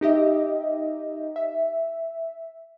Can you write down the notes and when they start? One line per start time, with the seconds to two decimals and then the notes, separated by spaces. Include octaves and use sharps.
0.01 D#4 G4 D#5 E5
1.36 E5